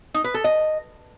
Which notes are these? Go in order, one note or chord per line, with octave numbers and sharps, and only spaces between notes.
D#4
B4
A4
D#5